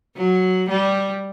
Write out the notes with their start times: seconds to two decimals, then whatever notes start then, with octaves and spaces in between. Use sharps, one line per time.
0.16 F#3
0.70 G3